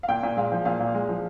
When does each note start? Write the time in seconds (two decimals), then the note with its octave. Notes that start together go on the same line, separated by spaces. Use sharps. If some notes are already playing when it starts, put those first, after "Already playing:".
0.03 F5
0.08 A#2 G5
0.23 A#2
0.37 G#3 F5
0.52 F3
0.65 A#2 F5
0.80 A#2
0.94 G#3
1.09 F3